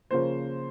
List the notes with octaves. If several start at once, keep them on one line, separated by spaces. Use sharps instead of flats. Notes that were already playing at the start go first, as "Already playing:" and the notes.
C#3 F3 A#3 C5